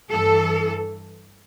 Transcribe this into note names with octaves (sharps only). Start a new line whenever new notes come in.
G2 E3 A4